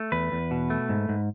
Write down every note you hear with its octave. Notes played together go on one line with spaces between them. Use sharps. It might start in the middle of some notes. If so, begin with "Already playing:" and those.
Already playing: A3
E2 B4
E2
B2
A3
G#2
G#2